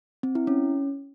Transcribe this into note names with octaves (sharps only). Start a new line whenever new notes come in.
C4
E4
C#4